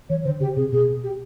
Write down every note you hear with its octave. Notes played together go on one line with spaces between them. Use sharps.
E3 C#5
D3 C5
C#3 G4
C3 G#4
B2 G#4
G4